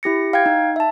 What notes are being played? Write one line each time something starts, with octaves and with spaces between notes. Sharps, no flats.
E4 G4 A#6 C#7
F5 G5 G#6
D#4
E5 A5